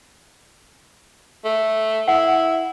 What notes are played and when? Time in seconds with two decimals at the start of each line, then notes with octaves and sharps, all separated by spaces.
1.44 A3
2.08 E4 F#5